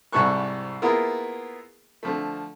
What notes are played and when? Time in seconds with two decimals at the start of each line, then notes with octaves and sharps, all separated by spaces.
0.13 C2 G#2 G3 A4 C#6 F#6
0.82 A#3 B3 E4 F4 G#4 A#4
2.03 D3 F3 A3